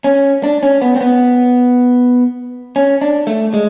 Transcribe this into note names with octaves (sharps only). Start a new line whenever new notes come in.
C#4
D4
C#4
B3
C4
B3
C#4
D4
A3
G#3